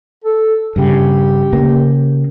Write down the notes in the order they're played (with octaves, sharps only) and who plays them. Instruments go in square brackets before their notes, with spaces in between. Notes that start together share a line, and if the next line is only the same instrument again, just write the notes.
[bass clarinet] A4
[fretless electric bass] G2 C#3 [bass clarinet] G4
[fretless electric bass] C#3 A#3